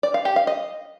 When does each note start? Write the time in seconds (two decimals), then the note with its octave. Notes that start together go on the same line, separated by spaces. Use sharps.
0.03 D5
0.14 F5
0.25 G4
0.36 F5
0.47 D#5